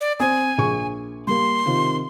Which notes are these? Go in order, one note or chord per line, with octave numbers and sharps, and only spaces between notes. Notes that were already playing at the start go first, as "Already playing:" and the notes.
D5
C4 G#5 D#6
A#1 G#4 C#6
G3 A#3 C6
C3 D#3 F4